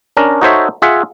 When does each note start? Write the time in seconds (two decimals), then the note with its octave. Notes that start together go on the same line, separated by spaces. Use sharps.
0.17 C#4 D4 A#4
0.41 D#4 F#4 A4 C5 C#5 E5
0.82 F4 G#4 E5 F#5